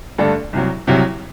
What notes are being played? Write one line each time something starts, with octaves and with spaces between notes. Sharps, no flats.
G2 D3 A3 D4 A4
C2 C3 F#3
C2 C3 F#3